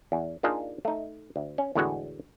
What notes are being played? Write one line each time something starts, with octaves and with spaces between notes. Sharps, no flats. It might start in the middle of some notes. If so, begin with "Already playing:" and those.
E2
A#3 D4 D#4 F4 G#4 A5
A3 D#4
D2
C#4
E2 A2 D3 G#3 B3 F#4